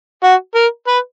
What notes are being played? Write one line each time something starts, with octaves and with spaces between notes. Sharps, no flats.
F#4
A#4
B4